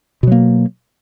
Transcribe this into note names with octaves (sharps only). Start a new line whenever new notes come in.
B2 F#3 A#3